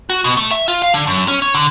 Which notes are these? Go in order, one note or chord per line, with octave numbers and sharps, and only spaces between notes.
F#4
B2
A3
E5
F4
F5
D3
F#2
C#4
C#5
D3